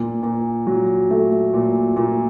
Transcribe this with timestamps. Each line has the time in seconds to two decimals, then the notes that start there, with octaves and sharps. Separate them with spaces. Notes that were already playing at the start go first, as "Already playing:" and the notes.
Already playing: A#2
0.23 A#2
0.67 F#3
1.11 A3
1.54 A#2
1.96 A#2